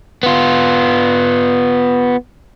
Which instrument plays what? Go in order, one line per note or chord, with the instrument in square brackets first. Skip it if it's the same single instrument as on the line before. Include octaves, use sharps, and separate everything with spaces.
[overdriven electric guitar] B3 F4